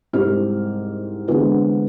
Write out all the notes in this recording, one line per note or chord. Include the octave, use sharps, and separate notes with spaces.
C2 G#2 C4 G4 F6
D3 E3 G#3 B3 C4